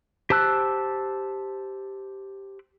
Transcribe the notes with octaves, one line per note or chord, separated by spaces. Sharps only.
G4 C5 A5 E6 F#6